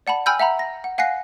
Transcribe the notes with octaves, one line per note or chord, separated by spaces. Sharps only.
D5 F#5 A5 B5
G5 G#5 B5 E6 F6 G6
E5 F#5 A#5 B5
A#6
F#5
F5 F#5 G#5 F#6 A#6 C7